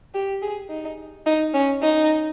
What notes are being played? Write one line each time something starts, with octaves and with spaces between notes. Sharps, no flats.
G4
G#4
D#4
D#4
C#4
D#4